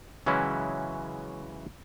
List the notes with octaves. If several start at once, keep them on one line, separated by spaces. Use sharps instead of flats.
C#3 E3 F#3 G#3 C#4 E4